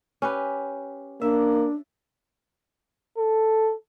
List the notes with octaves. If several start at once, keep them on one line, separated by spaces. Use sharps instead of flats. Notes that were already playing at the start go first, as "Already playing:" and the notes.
C#4 G4 B4
A#3 D4 E5
A4